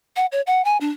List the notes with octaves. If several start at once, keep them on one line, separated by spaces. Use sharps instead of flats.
F#5
C#5
F#5
G#5
D4